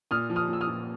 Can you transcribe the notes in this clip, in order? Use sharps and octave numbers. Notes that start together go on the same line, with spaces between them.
A#2 D#6 F6
F3
D#6 F6
A#2 E6
D#6 F6
A#2